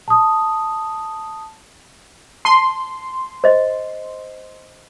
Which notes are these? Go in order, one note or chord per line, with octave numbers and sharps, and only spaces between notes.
A5 D#6
A5 C6
C5 D#5